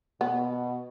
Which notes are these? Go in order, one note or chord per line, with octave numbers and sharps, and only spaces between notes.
B2 B3